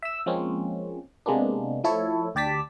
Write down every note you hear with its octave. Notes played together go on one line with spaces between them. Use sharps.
E5 E6
F3 G#3 A#3 C4 C#4
C3 G#3 A#3 B3 D4
F3 A3 E4 A4 C#5
D2 G4 D5 A5 B6